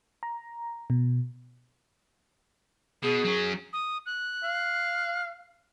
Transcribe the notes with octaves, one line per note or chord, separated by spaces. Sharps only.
A#5
B2
B2 G#4
F#3 C#4
D#6
F#6
F5